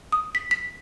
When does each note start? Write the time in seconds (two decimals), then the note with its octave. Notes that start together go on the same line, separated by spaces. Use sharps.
0.12 D#6
0.35 B6
0.51 B6